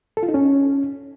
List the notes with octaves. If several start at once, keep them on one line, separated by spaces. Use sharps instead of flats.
A4
F4
D#4
C#4